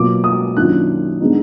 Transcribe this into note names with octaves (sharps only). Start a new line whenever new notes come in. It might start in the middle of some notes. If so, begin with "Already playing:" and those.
Already playing: B2 F#3 A#3 F4 D6
D#6
F#2 D#3 A#3 D4 F4 F#6
D3 G#3 B3 D#4